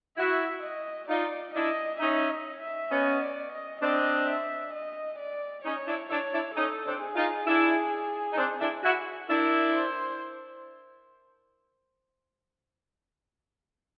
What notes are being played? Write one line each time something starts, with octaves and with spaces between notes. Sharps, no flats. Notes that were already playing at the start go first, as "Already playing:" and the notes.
E4 F#4 E5
D#5
D#4 F4 D5
D4 E4 D#5
C#4 D#4 E5
D#5
E5
B3 C#4 D#5
D5
D#5
C4 D4 D#5
E5
D#5
D5
C#4 D#4 C#5
D4 E4
D4 E4 C#5
D4 E4
C#4 D#4 A4
C4 D4
G#4
D#4 F4
D4 E4
D#4
C4 D4
D4 E4
E4 F#4
D4 E4 A#4
C5